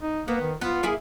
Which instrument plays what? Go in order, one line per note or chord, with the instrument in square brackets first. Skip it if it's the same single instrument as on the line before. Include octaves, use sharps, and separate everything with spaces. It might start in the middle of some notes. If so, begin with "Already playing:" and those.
[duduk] D#4
[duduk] A#3 [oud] B3
[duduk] D#3
[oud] B3 [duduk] F4
[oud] A#3 E4 G#4